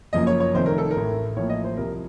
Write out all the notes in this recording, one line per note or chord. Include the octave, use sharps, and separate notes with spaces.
F#1 F#2 F3 A#3 D#5
C#5
C#5
F1 F2 D#3 A3 C5
A#4
A4
A#4
A1 A2 A3
A1 A2 F3 A#3 C#5
D#5
C5
C2 C3 F3 A#4